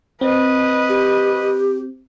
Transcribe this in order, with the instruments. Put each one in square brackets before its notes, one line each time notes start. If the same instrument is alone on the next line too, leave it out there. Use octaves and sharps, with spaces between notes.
[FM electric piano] C4 [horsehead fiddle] B4 D#5
[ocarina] G4